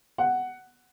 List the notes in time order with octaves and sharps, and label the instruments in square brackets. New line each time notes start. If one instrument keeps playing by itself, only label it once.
[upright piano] F#5